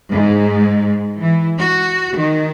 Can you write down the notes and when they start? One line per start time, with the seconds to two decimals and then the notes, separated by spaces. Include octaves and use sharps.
0.10 G#2
1.19 E3
1.59 F#4
2.17 D#3